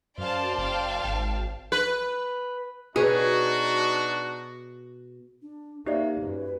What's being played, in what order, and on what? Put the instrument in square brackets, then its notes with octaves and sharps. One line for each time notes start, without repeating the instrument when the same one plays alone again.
[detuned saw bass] F#2 [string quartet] C5 D5 [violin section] F5 A5
[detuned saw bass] F#1 [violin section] F5 G5 A5
[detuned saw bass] G#1
[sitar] B4
[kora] B2 B4 C#5 [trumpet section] D4 D#4 F#4 [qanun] G#4
[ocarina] D4
[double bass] A#3 [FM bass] D#4 [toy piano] G4 C5 D5 [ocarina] E5
[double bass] F#2 [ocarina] B4